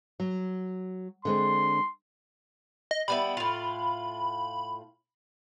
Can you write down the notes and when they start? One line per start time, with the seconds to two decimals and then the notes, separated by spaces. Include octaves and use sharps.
0.20 F#3
1.25 D3 G#3 C4 C6
2.91 D#5
3.08 G3 B3 E4 B5
3.37 A2 F4